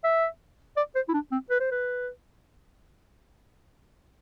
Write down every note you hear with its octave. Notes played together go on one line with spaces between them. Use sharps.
E5
D5
C5
E4
D4
C4
B4
C5
B4